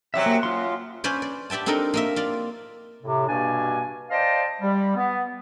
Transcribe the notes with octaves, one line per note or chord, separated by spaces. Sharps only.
F#2 C3 F#3 E5
A#3
F#2 F4 C6
C#4 B4 C5 D5
D5
G4 D5 E5 G5 A5
C4 D4 D#4 A4 A#4 D#5
A#3 D#5 E5
F4 D5
A2 C3
G2 B2 A#3 D4 G#5
C5 D5 D#5 F5 G5 A5
G3
B3